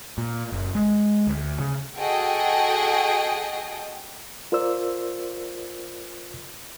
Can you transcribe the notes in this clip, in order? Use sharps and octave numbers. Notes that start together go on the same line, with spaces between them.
A#2
F#1
G#3
D2
C#3
F#4 G#4 A4 D#5 G5
F4 A#4 C5 D5 E6